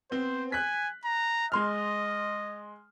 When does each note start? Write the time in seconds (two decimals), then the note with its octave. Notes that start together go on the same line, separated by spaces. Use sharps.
0.11 B3 C4 C5
0.52 G#5 F#6 B6
1.05 A#5
1.52 G#3 D#5 C6 F6